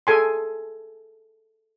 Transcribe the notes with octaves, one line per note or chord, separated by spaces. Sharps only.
G#4 A4 G#5 C6